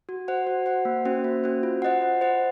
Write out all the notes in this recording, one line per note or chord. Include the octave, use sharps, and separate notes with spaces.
F#4
C5 F#5
F#4
C5 F#5
A#3
C#4 F#4 C5
A#3
C#4 F#4 C5
F4
C5 D#5 F#5
F4
C5 D#5 F#5